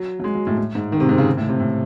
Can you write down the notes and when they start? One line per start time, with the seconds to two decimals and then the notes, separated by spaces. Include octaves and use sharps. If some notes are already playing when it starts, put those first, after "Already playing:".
Already playing: F#3
0.20 F#3
0.24 G#3
0.35 F#3
0.47 A2
0.58 A2
0.75 G#2
0.92 D#3
1.00 C3
1.09 G#2
1.18 C#3
1.37 A2
1.49 C3
1.60 A2